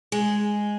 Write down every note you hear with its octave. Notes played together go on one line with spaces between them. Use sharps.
G#3